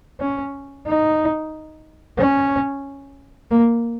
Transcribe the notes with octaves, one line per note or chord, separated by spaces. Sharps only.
C#4
D#4
C#4
A#3